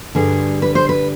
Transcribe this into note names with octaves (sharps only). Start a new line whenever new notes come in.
G2 D3 G3 G#4
B4
C5
B4